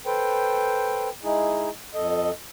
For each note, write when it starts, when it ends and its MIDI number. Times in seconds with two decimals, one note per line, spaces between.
0.06 1.09 69
0.06 1.09 71
0.06 1.09 72
0.06 1.09 79
1.24 1.70 56
1.24 1.70 63
1.24 1.70 64
1.24 1.70 68
1.94 2.30 41
1.94 2.30 69
1.94 2.30 75